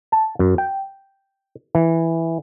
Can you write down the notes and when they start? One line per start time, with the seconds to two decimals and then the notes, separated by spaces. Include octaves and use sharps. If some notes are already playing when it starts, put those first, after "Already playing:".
0.12 A5
0.39 F#2
0.58 G5
1.75 E3